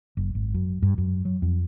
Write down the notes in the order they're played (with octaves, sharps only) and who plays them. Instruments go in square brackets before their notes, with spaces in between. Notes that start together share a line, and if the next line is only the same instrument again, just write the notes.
[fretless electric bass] F#1
G#1
F#2
G2
F#2
F#3
F2